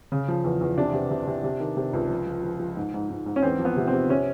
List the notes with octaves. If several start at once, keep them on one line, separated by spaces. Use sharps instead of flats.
C#3
F3
E2
E2
C3 D4
C3
C3
C3
C3
D#3
C3
C#2
F3
F3
F3
F3
G#2
G#2
G#2
G#2
C#4
E2 C4
F3
B3
C3
C4
C3
C3 C#4